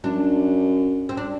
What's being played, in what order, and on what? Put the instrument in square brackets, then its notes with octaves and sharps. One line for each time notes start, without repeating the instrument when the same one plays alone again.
[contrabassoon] F#2 [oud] D4
[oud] C4
D4